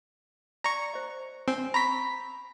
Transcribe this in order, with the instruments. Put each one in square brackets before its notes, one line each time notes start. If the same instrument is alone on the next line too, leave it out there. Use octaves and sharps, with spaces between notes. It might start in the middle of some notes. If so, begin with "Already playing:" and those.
[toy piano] D5 [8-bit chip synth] A#5 C#6
[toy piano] C5 D#5
[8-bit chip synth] C4 [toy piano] G#5
[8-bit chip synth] A#5 B6 [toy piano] B5 C#6